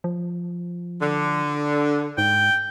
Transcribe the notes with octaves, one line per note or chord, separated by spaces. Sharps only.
F3
D3
G#2 G5